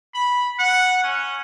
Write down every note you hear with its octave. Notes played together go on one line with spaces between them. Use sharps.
B5
F#5
C#4